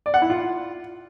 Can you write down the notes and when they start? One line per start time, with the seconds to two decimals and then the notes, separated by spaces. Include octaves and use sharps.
0.06 D5
0.14 F#5
0.22 E4
0.30 F4